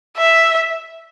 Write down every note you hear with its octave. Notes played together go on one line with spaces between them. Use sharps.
E5